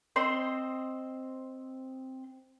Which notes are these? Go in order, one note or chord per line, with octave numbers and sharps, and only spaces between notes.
C4 C5 D#5 C6